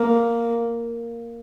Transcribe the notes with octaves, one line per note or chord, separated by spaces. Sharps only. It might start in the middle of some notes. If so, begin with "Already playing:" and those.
Already playing: A#3